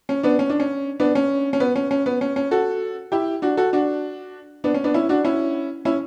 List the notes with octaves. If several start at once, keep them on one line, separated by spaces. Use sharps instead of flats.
C#4
B3 D4
C#4
D4
C#4
B3 D4
C#4
C#4
B3
C#4
C#4
B3
C#4
C#4
F#4 A4
E4 G4
D4 F#4
F#4 A4
D4 F#4
B3 D4
C#4
B3 D4
C#4 E4
D4 F#4
C#4 E4
C#4 E4